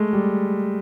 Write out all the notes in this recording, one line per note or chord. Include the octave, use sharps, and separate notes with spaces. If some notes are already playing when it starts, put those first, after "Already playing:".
Already playing: G#3 A3
G3